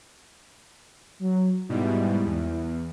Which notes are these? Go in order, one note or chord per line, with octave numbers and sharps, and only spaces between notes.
F#3
G#2 B2 G3 E4
E2